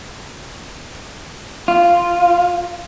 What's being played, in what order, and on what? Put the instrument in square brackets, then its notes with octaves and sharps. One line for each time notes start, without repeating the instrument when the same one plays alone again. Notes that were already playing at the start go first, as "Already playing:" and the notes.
[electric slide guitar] F4